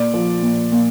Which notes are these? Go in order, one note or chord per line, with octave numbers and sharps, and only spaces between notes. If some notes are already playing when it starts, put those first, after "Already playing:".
Already playing: A#2 D5
F3
A#2
A#2